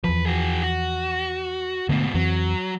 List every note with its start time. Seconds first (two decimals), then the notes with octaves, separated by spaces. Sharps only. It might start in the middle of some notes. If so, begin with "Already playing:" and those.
0.04 E2 F3 B4
0.26 F#4 G#4
0.63 F#4
1.89 G#2 B2 D3 A3 B3
2.14 F2 E3 F#3 C4